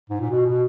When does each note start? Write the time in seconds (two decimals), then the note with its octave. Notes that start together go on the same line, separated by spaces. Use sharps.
0.09 G#2
0.20 A#2
0.30 B2
0.47 B2